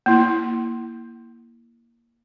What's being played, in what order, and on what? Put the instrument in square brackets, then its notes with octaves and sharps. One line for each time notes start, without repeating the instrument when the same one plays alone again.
[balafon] A#3 E4